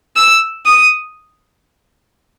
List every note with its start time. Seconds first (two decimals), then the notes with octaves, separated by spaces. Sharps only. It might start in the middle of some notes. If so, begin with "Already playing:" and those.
0.16 E6
0.66 D#6